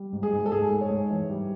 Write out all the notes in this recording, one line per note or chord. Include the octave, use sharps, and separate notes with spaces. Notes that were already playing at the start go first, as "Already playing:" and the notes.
Already playing: G3
G#2
G#4
G#2
A4
G#2 G#4
G#2
C#5
G#2
E3
G3